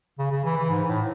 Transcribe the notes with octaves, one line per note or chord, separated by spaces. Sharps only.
C#3
C#3
E3
E3
G#2
A2